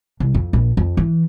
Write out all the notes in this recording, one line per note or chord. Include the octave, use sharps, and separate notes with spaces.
C2
F2
A#1
F2
E3